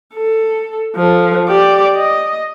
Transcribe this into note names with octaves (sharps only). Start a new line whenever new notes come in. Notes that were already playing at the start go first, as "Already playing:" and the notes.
A4
F3 A4
G4 D5
D#5